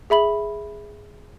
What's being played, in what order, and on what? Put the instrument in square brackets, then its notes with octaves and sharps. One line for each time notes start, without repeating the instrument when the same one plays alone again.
[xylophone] G#4 E5 B5 F#7